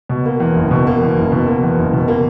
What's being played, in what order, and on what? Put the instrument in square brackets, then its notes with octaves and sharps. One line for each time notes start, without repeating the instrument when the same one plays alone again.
[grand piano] B2
A#3
E2
F#1
B2
A#3
E2
F#1
B2
A#3
E2
F#1
B2
A#3